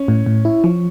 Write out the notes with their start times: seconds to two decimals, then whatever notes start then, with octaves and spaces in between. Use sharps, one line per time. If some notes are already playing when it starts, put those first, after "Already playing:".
Already playing: C#4
0.08 A2
0.26 A2
0.45 E4
0.64 F3